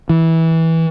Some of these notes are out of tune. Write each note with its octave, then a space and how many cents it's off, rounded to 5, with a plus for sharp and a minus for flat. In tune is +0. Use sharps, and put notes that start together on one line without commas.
E3 -15